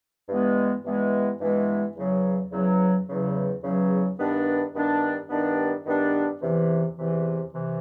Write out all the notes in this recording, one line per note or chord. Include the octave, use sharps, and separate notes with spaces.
G2 E3 G#3 B3
G2 E3 G#3 B3
G2 E3 G#3 B3
E2 C#3 F#3
E2 C#3 F#3
E2 C#3 F#3
E2 C#3 F#3
G2 D#3 G3 B3 D4
G2 D#3 G3 B3 D4
G2 D#3 G3 B3 D4
G2 D#3 G3 B3 D4
E2 C3 E3
E2 C3 E3
C3 E3